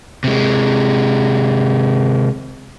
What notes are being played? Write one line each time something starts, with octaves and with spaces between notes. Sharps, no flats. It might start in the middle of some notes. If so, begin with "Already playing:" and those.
C3 G#3